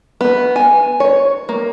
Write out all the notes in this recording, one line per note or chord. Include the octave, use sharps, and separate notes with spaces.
B3
G#5
C#5
A#3